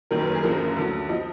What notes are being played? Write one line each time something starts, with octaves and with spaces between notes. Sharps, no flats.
F#1 F#2 D#3 F#3 A#4
B4
A#4
G#4
F#1 F#2 D3 F3 A#4
D2 D3 F#3
F3 D#5